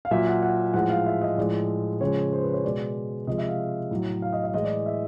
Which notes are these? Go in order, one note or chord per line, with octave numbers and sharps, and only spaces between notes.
F5
A#2 F#3 E5
F#5
F#5
A2 F3 G#3 F#5
F5
E5
D#5
A2 F3 G#3 D5
C#3 F3 G#3 C#5
C5
B4
C#5
B2 G#3 D5
C3 F3 G#3 D#5
E5
F5
A2 F#3
F5
D#5
D#5
A2 E3 G#3 D#5
D5
E5